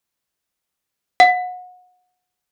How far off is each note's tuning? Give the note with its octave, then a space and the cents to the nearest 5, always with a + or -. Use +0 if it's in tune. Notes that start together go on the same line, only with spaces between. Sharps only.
F#5 -30